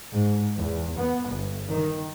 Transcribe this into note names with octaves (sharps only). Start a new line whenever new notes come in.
G#2
E2
B3
G1
D#3